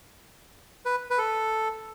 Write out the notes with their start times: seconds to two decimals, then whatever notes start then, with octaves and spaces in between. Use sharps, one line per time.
0.86 B4
1.10 B4
1.18 A4